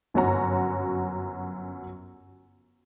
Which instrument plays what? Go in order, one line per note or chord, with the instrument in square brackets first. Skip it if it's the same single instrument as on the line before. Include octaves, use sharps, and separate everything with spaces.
[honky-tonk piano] G1 F#2 C#4 F#4 A#5